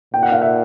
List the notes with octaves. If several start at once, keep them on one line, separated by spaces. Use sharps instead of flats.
A#2 G5
F#5
F5
E5 F#5